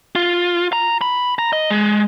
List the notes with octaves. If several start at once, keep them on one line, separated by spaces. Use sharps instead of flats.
F4
A#5
B5
A#5
D#5
G#3